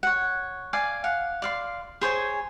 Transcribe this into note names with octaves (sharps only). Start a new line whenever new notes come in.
C#5 F#5
D5 F5 G#5
F5 F#5
D5 F5 C6
G#4 C5 C#5 G#5